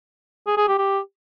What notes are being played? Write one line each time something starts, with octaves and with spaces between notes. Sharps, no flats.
G#4
G#4
G4
G4